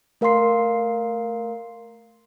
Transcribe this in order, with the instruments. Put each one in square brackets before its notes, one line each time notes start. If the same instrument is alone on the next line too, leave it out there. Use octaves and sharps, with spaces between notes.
[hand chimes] A3 A#4 F5 A#5 C6 C7